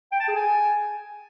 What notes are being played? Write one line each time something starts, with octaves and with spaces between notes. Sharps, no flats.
G5
A5
G#4
G#5